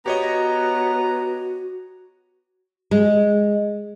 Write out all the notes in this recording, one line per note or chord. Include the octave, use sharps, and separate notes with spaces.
B3 F#4 G4 C#5 D#5 A#5
G#3